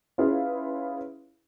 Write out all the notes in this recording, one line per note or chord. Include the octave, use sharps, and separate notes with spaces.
C#4 E4 F4 G#4 B4 F5